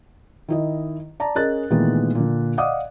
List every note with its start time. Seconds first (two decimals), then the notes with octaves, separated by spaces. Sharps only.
0.49 D#3 E4 D#5
1.20 D5 A5 A#5
1.35 C#4 G#4 A#4 D#5 F#6 A6
1.70 A#2 D#3 E3 G#3 A3 B3
2.15 A#2 D3
2.58 D5 D#5 F5 F#5 D6 D#6